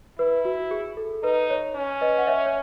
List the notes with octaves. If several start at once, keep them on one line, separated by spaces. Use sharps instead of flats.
E4 B4
F#4
G#4
A4
D#4 B4
C#5
C#4
B4 D#5
F#5
C#5 E5
C#5